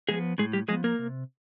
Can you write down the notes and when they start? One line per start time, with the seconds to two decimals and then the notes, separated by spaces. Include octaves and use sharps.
0.09 F3 G#3 B3 G#4
0.38 A2 G#3 G#4
0.53 G3 G4
0.68 F3 G#3 G#4
0.72 B3
0.84 A#3 A#4
0.99 C3